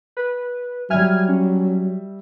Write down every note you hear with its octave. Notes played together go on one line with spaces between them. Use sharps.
B4
F#3 G3 E5 G#5 F6 G#6
C#4